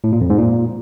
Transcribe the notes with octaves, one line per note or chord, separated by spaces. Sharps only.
A2
A#2
F2
G#2
A#2